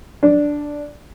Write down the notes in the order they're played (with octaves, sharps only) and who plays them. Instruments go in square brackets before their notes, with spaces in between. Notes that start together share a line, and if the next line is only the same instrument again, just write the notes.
[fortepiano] D4